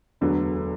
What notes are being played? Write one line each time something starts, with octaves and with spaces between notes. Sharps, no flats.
E1 D2 D3 F#3 B3